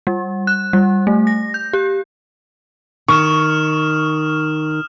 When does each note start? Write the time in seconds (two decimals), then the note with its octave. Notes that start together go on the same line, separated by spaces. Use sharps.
0.07 G3
0.47 F#6
0.73 G3
1.07 A3
1.27 A#6
1.54 G6
1.73 G4
3.08 D#3 C#6 D#6 F6 E7